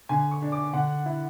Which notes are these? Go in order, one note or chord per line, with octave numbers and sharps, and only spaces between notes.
D3 G#5
C#6
D4
D6
D3 F#5
E4